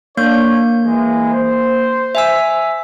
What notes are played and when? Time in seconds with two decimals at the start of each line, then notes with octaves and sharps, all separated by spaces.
0.17 A#3 D4 C#5 G6
0.85 E3 G#3
1.33 C5
2.15 E5 G#5 E6